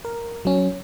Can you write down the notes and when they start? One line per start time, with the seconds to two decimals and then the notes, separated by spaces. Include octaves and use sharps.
0.05 A#4
0.45 F#3 C#4